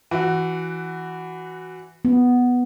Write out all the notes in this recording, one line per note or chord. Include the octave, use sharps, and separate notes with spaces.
E3 F#4
B3